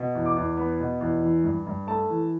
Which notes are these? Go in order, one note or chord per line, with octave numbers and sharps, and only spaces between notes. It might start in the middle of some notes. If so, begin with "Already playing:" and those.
Already playing: B2
E2
D6
E2
B3
B2
E2
E3
G2
G2
A3 A5
E3